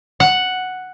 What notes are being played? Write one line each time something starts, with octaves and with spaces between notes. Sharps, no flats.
F#5